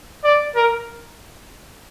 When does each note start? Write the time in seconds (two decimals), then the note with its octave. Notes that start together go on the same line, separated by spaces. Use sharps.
0.24 D5
0.55 A#4